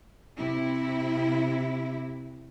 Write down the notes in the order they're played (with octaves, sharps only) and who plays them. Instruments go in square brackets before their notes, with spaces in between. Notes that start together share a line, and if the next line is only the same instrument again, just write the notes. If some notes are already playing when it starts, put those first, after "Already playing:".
[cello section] C3 E4